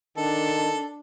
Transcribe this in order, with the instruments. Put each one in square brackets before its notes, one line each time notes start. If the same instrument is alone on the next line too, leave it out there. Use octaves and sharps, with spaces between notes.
[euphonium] D#3 [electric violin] D4 [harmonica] A4